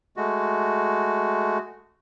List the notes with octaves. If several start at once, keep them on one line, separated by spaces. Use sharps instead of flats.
G#3 A3 F#4